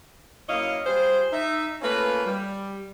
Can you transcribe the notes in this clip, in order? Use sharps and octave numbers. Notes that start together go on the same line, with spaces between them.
F#2 A#3 E4 C#5 D#5 F5
G3 F4 G#4 C5
D#4 E5
A3 A#3 C#4 F4 B4
G3